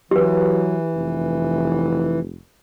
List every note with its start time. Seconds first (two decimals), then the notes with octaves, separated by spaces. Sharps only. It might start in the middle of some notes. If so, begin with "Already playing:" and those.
0.11 E3 F#3 G4 B4
0.95 F1